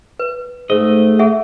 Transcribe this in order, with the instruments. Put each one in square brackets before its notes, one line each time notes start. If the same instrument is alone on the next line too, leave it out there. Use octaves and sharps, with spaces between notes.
[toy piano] B4
[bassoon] G#2 [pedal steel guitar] A3 D#5
[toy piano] G#4 E5 F#5